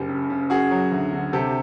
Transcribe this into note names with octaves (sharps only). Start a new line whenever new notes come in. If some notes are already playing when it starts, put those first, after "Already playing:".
Already playing: F#1 G4
C#3
C#3
F#2 F#4 G#4
F#3
D2
D3
C3 G4 A4